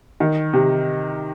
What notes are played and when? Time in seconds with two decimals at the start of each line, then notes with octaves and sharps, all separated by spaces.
0.20 D#3
0.53 C3